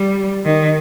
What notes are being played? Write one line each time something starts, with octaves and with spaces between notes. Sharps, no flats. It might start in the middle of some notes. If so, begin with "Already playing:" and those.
Already playing: G3
D#3